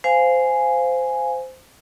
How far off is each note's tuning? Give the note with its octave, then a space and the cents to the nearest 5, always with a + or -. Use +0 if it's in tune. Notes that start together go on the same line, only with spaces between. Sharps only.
C5 -15 F5 +0 G#5 +0